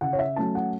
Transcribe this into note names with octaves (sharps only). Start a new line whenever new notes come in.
C#3 F#5
C#5
E5
F#3 A3 C#4 A5
F#5